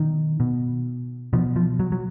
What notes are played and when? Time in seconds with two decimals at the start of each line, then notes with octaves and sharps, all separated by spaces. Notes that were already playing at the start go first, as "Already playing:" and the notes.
Already playing: B2 D#3
0.40 B2
1.33 B2 F3
1.56 F3
1.79 F#3
1.92 F#3